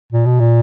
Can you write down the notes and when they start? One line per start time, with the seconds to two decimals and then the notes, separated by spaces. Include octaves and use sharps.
0.12 A#2
0.26 B2
0.40 A#2